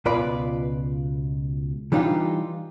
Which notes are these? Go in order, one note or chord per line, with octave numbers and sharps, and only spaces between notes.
C#2 B2 F4 B4 D5 B5
E3 G3 D4 D#4 F4 G4